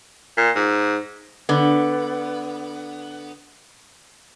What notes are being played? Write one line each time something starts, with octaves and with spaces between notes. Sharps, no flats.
A#2
G#2
D3 B3